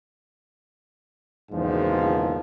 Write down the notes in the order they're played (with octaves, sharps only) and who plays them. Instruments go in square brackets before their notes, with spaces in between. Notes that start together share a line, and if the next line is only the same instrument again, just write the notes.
[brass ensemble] F#1 B1 E2 G#2 D#3 F3